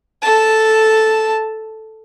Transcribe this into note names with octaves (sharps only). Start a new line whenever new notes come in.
A4 A5